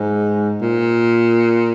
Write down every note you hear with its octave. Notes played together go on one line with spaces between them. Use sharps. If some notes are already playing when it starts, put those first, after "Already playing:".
Already playing: G#2
A#2